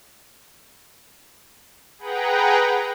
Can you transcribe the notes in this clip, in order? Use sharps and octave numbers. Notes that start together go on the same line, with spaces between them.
G#4 B4 F#5 G5 A#5